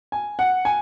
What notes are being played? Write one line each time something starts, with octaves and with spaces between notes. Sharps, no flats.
G#5
F#5
G#5